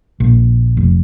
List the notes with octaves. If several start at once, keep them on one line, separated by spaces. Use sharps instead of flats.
A#1
F1